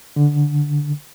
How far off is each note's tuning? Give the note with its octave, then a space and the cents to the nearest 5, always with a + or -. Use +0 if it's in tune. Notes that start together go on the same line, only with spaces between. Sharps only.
D3 -5